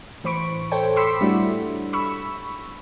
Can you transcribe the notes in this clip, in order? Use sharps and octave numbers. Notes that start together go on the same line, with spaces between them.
A2 E3 C5 B5 C#6 D7
A4 C5 C#5 G5 C#6
B5 C6 D6 E6 B6 C#7
G3 A3 D4 E4 F#4
B5 C#6 E6